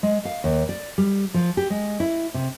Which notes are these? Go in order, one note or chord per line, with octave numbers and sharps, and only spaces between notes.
G#3
F5
D#2
D5
G3
F3
G4
G#3
E4
C3